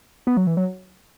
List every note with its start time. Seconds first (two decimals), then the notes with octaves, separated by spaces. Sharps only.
0.27 B3
0.37 F#3
0.47 E3
0.57 F#3